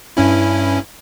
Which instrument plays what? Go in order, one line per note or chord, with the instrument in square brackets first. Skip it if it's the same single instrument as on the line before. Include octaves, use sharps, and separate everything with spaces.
[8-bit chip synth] G2 C#4 E4